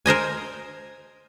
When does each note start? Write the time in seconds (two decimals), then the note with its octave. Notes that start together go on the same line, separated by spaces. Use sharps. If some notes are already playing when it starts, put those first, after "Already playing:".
0.06 A#4 C5 D#5 G#5